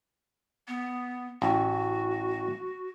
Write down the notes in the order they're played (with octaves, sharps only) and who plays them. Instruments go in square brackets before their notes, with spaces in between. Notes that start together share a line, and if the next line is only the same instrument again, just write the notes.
[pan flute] B3
[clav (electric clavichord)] A1 [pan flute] F#4